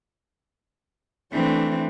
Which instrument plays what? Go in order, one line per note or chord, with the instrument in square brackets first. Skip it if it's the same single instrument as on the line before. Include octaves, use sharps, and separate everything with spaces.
[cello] E3 C4 [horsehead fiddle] A3 D4